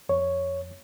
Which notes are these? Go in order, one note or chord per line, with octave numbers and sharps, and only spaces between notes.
F2 C#5